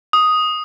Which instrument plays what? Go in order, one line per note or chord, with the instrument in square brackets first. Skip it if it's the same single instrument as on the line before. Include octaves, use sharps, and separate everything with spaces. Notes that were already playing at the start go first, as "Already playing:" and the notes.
[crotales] D#6